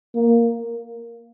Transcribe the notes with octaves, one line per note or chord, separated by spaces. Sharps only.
A#3